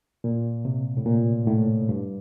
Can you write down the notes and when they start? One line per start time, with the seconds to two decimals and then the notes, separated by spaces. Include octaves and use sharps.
0.24 A#2
0.65 C3
0.97 A2
1.06 A#2
1.47 A2
1.89 G2